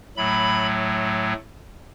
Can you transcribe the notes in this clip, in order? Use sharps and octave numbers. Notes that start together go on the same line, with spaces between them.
A2 F#3 A3 B5